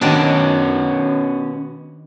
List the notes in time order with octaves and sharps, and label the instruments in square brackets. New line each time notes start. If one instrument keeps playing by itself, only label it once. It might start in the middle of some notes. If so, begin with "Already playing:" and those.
[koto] D#3 D4 [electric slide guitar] B3 C#4 F#4